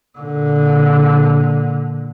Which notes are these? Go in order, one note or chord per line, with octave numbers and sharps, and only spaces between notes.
A#2 D3